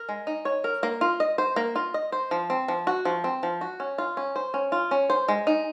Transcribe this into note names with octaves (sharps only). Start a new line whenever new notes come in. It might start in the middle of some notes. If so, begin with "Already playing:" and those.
Already playing: A#4
G#3
D#4
C#5
A#4
A#3
F4
D#5
C5
A#3
F4
D#5
C5
F3
C4
F3
F#4
F3
C4
F3
F#4
C#4
F4
C#4
C5
C#4
F4
C#4
C5
G#3
D#4